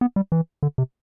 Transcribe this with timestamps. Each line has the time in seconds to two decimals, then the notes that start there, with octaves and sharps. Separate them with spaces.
0.01 B3
0.16 G3
0.32 E3
0.63 D3
0.78 C3